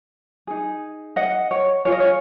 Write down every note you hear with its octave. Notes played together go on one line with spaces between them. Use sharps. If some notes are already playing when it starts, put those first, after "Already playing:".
D#4 G#4
D#5 F#5
C#5
F4 G#4 C#5
D#5
C#5